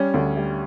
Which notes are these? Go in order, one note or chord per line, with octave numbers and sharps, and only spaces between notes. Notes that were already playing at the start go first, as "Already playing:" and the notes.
Already playing: G3 C#4
D2
G3